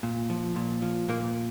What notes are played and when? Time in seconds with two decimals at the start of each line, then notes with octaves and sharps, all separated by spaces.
0.03 A#2
0.30 F3
0.56 A#2
0.82 F3
1.09 A#2 A#3